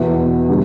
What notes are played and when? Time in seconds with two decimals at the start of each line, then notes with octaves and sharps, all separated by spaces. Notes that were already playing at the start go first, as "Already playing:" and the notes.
Already playing: E2 B2 B3 E4
0.49 D3 G3